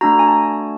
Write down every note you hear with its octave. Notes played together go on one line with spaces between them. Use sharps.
A3 D4 F#4 A#5
G#5
A5